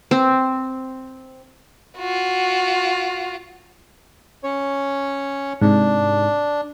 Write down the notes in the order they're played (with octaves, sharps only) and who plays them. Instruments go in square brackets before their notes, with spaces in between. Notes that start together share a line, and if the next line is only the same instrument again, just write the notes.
[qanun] C4
[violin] F4 F#4
[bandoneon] C#4 C#5
[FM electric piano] G#2 C3 [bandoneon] D4